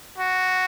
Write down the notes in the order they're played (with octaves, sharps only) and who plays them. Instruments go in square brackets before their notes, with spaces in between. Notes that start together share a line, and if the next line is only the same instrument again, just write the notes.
[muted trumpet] F#4